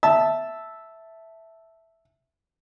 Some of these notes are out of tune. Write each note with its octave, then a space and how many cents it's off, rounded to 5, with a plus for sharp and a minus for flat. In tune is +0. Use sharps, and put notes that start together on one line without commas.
E5 +0 A5 +0